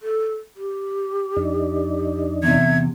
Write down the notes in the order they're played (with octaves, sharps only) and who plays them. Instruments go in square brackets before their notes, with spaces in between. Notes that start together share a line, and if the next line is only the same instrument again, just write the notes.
[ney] A4
G4
[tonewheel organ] F2 D4 D#4
[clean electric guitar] E2 C3 [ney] E5 [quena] G#6